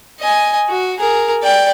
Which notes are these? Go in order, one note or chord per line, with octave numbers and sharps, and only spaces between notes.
D#5 G#5
F#4
G#4 A#4
D5 G5